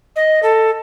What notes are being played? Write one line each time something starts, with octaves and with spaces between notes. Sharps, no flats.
D#5
A4